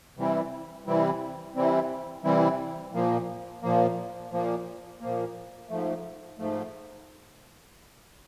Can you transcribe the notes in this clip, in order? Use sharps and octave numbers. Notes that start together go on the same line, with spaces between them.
C3 E3 G3 C4 E4
C3 E3 G3 C4 E4
C3 E3 G3 C4 E4
C3 E3 G3 C4 E4
A#2 F3 A#3
A#2 F3 A#3
A#2 F3 A#3
A#2 F3 A#3
G#2 F3 A3
G#2 F3 A3